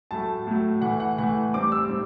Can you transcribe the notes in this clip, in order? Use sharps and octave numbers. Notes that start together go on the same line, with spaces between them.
A2 F#3 A3 A5
A2 F#3 A3
A2 E3 A3 F#5
F#5
A2 E3 A3 F#5
A2 G3 C4 D6
E6
A2 G3 C4